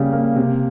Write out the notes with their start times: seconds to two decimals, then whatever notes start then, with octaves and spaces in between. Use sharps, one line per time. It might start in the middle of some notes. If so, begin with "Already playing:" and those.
Already playing: C#3 G3 A#3
0.12 A#3
0.36 C3